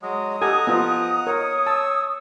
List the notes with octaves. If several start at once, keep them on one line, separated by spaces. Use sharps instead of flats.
F#3 G#3 D#6
G4 A4 D#5 F#5 G#5 A#5
F3 B3 F4
A#4 C#5 D#6
A5 E6